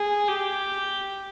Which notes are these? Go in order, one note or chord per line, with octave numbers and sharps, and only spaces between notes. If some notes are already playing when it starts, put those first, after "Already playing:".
Already playing: G#4
G4